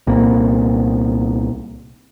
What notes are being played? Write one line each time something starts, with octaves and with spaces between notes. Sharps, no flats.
C2 A#2